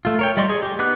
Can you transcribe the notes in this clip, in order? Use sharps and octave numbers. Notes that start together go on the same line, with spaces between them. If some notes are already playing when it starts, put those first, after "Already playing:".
A3 F4
A#4 C#5 G5
G3 D5 D#5 C6 C#6
G#4
G4
B3 D#4 D6 F#6